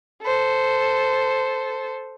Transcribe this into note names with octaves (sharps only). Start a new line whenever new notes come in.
A4 C5